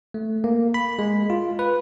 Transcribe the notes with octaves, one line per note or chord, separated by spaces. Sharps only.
A3
A#3
B5
G#3
F4
B4